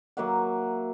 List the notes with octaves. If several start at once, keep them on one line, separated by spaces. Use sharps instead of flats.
F#3 A#3 E5 F#5